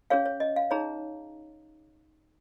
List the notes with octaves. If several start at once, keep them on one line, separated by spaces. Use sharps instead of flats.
C#4 G#4 C#5 F5
C#5
D#5
F5
D#4 G#4 C#5 A#5